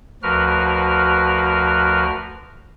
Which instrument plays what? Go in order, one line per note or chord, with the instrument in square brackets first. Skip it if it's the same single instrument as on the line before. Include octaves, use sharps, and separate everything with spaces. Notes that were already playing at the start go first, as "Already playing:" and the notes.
[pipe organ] D2 F3 F#4 A#4 B4 F6